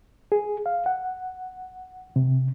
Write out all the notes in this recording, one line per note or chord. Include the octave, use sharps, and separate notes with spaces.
G#4
F5
F#5
C3